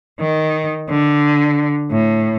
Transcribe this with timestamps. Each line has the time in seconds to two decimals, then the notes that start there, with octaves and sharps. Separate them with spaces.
0.19 D#3
0.88 D3
1.89 A2